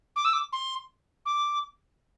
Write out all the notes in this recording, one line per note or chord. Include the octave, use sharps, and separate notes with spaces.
D6
E6
D6
C6
D6